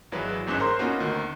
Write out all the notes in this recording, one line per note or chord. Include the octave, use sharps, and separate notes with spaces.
G#1 E3 F#3 G#3 B4
G1 E2 G#2 C#4 F#6 E7
A#4 C5 A#5 C6
A#3 B3 C#4 D#4 F4 F#4
D2 D#3